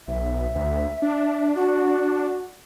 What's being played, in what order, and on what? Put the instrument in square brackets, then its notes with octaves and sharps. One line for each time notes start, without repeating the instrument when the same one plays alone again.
[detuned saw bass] B1 [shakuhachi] E5
[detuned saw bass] D2
D4
[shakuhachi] F#4